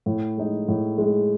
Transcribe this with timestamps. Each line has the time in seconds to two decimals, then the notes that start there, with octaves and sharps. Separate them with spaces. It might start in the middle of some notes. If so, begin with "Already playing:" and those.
0.06 A2
0.37 G#3 D#4
0.68 A2
0.98 G#3 D#4